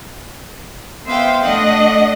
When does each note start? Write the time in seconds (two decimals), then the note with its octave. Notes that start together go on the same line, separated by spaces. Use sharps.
1.06 B3 C5 E5 F5 G5
1.41 A3 D4 D#5 F#5